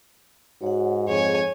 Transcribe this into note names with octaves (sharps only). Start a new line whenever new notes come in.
G#2 F#4 C#5 F#5
F2 G#4 C#5 G#5